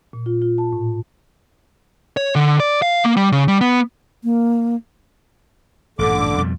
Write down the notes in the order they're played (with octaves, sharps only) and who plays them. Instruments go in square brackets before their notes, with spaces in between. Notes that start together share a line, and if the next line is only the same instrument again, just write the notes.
[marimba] A#2
F4
F4
A5
A2
[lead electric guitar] C#5
D3
D5
F5
A#3
G3
C#3
G3
B3
[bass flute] A#3
[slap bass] A1 G2 A#2 [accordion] D3 D6
[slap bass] F2 B2 G3